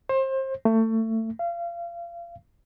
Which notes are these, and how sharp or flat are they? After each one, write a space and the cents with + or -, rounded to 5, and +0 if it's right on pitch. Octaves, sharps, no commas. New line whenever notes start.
C5 +30
A3 +25
F5 -30